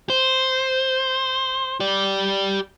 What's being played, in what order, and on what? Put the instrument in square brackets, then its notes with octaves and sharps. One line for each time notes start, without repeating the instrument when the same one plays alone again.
[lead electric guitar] C5
G4 D5